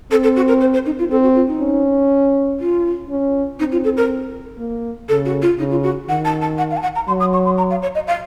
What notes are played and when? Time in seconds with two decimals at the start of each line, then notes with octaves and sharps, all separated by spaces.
0.11 C4 A4
0.23 A4
0.36 F#4
0.48 A#4
0.61 C5
0.73 C5
0.86 D#4
0.99 F4
1.10 C4 A4
1.23 F#4
1.35 F4
1.48 D#4
1.60 C#4
2.60 F4
3.10 C#4
3.59 C4 D#4
3.72 F4
3.84 A4
3.97 A#4
4.58 A#3
5.09 C#3 A4
5.25 F#4
5.42 F4
5.58 C#3 D#4
5.70 F4
5.83 F#4
6.08 D#3 F#5
6.25 A5
6.42 A5
6.58 F#5
6.71 F5
6.77 A5
6.82 F#5
6.95 A#5
7.08 F#3 C6
7.20 D#6
7.33 C#6
7.45 C6
7.58 A#5
7.70 F5
7.82 C#5
7.95 D#5
8.07 F5